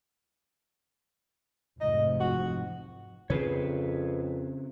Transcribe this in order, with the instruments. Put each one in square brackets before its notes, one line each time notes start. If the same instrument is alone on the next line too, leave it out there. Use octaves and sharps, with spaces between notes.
[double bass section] F1 G#2 F3 [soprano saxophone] D#5
[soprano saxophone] F#4
[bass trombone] F2 [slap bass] C#3 C4 [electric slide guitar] G#4 B4 C#5